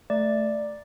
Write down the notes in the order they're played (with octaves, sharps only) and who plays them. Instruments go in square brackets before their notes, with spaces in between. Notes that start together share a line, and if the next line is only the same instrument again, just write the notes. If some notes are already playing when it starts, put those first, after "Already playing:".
[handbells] A3 D5